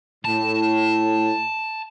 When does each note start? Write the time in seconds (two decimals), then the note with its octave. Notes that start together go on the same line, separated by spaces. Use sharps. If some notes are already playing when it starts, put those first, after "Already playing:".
0.25 A2 A5